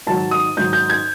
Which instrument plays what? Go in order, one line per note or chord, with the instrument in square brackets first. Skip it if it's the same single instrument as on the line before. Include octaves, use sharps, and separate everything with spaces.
[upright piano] G#2 D#3 F#3 A5
D#6
G#2 D#3 F#3 G6
G6
G#6